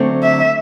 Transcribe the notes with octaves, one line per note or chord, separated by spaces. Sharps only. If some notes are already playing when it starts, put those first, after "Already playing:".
Already playing: D3 F#3 A3 C4
E5